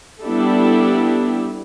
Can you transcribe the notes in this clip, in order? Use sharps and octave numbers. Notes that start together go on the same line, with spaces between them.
G3 B3 D4 E4 G4 A4